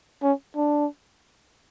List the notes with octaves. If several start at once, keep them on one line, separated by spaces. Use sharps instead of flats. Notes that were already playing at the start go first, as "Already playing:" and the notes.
C#4
D4